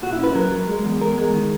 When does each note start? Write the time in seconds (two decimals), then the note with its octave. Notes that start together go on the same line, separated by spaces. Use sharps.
0.02 A#2 F#4
0.13 E4
0.18 C#4
0.24 B4
0.35 F#3 A#4
0.51 F#3
0.68 G#3
0.84 E2
1.00 E2 A#4
1.18 G#3
1.33 D#3